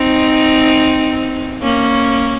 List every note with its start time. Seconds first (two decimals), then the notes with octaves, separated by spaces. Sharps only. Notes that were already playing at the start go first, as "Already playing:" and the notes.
Already playing: C4 D#4
1.62 A#3 C#4